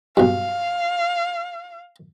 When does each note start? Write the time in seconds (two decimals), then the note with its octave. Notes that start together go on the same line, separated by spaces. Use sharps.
0.17 B1 G2 F5